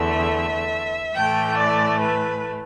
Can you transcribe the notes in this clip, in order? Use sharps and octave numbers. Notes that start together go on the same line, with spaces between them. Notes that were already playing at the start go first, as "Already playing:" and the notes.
Already playing: E2 D3 A3 E5
A2 E3 A3 G5
D5
B4